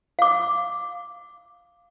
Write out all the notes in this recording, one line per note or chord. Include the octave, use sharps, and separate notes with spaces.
F5 D6